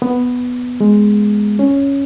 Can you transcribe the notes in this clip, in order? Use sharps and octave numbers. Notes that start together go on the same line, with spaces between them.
B3
G#3
C#4